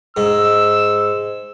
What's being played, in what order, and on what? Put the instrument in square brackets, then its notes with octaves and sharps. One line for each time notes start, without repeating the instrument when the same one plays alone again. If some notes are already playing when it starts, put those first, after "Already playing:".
[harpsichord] G#2 [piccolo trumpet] E6